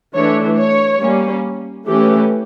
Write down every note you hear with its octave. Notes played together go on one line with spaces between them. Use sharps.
E3 A3 D4 C#5
C#5
G3 A#3 C#4
E3 A3 C#4 G4